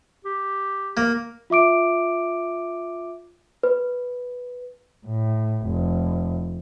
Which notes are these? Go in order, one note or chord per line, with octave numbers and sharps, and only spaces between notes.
G4
A#3
F4 E5 D6 D7
B4
A2
F1